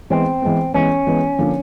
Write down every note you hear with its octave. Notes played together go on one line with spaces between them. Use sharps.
E3 G#3 B3 C4
E3 G#3 B3
E3 G#3 B3 C#4
E3 G#3 B3
D3 F3 A#3 D4